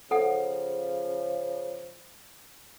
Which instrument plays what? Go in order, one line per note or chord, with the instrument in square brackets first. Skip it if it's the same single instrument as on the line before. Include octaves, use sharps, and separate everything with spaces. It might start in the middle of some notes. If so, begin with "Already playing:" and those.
[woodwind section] C#3 F3 [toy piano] A4 F#5